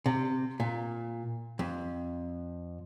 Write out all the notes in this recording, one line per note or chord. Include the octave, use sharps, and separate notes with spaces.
C3
A#2
F2